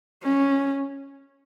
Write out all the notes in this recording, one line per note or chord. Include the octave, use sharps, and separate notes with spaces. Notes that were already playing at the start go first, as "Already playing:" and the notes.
C#4